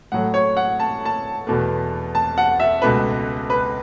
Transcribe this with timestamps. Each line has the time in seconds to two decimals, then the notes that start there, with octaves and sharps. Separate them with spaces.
0.12 A2 F#3 A3 F#5
0.34 C#5
0.57 F#5
0.80 A5
1.05 A5
1.47 E2 B2 A3
2.15 A5
2.38 F#5
2.60 E5
2.82 C#2 B2 A3 B4
3.50 B4